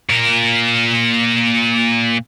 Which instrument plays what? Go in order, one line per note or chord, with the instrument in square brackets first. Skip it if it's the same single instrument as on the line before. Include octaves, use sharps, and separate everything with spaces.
[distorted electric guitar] A#2 A#4